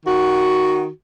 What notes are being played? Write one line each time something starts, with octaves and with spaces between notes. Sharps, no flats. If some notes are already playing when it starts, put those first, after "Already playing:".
D#3 F#4